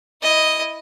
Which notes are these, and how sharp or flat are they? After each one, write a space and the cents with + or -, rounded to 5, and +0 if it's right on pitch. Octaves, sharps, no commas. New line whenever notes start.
E4 -10 D#5 +0